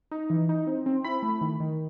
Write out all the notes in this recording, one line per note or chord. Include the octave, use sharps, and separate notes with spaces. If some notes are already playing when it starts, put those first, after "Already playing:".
D#4
E3
D#4
C4
C4
E4 B5
A3
D#3
D#3